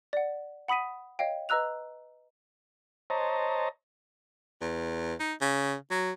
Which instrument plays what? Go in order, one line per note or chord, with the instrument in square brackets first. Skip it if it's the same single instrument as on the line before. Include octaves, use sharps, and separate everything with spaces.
[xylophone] D5 F#5
F#5 B5 D#6 B6 D#7
C#5 D#5 F5 G5
B4 D#5 A#5 E6 F#6 F7
[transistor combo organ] C5 C#5 D#5 A5 A#5
[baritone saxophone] E2
D#4
C#3
F#3